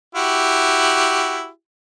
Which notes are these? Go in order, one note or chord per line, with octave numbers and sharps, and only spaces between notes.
E4 F#4 G4